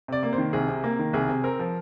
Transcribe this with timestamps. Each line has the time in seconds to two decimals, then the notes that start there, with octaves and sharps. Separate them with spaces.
0.08 C3 D5
0.23 A#3
0.33 C5
0.38 D#3
0.53 C2 G#4
0.68 C3
0.84 A#3 A#4
0.99 D#3
1.13 C2 G#4
1.29 C3
1.44 C4 A#4
1.59 F3